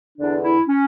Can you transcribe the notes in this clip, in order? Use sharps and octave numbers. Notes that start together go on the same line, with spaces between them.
E2 D3 D4
E4
C#4